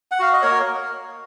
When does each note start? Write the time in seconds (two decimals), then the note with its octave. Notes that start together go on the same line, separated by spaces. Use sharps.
0.12 F#5
0.19 F#4 F5
0.33 D#5
0.42 A#3 A#4 C#5